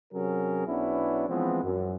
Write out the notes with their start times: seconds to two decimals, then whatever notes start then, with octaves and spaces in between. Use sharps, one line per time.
0.13 C3 F#3 C#4 G#4 A#4
0.67 B1 B3 C#4 D4 E4
1.28 E3 F3 G#3 B3 C4
1.63 F#2